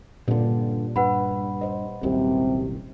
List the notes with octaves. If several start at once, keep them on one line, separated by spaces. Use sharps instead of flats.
G2 A#2 D3 C#4
G2 B4 F#5 B5
C5 D#5
D#1 C2 F#2 C3